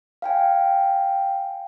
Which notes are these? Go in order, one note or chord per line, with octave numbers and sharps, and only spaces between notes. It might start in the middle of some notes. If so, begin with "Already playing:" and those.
F5 G5 G#5